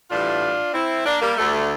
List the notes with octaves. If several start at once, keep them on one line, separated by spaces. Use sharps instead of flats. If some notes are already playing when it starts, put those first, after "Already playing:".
A2 E3 G3 D4 F4
C4 E4
A#3 D4
G3 A#3
D2 D3 G3 A3